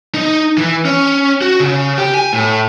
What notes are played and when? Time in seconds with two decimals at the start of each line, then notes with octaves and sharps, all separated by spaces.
0.14 D#4
0.58 E3
0.85 C#4
1.42 F#4
1.60 C#3
1.98 G4
2.14 G#5
2.33 A2